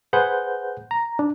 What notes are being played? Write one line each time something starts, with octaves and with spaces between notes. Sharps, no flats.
G#4 B4 C5 F#5 G6
A#5
D4